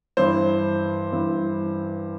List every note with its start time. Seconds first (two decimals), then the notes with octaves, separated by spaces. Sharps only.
0.17 G2 E3 C5
1.12 G2 E3